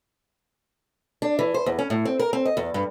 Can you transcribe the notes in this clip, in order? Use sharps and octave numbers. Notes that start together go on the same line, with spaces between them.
D4
E3
C5
E2
C#4
A2
C4
A#4
C4
D#5
E2
G2